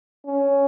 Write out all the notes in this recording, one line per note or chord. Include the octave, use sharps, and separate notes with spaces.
C#4